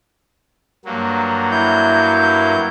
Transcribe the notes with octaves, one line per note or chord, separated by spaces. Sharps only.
G2 F#3 A#3
E4 G6